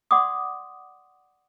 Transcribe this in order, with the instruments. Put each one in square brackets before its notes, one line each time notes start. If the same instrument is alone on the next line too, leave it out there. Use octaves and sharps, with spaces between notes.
[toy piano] D5 F#5 C6 D6 D#6